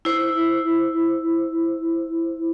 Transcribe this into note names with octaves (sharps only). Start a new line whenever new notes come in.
E4 C5